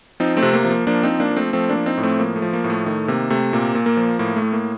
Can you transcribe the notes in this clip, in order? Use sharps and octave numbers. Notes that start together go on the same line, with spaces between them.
F3 C4 D#4
A3 C4
C3
A#3
F3
A#3
F3 A#3 D4
C4 D#4
F3
A#3 D4
F3
A3 C4
F3 A3 C4
A#3 D4
F3
C4 D#4
A2
A3 C4
F3 A#3
A3
F3
A#3
A2
A3
D#3 A3
C3 A#3
C3 A3
A#2 A#3
A#2
A#3
F3
A2 A#3
A3
A2
A#3